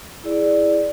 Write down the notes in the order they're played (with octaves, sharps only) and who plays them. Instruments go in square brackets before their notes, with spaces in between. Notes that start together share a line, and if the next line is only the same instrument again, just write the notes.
[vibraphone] E4 G#4 D5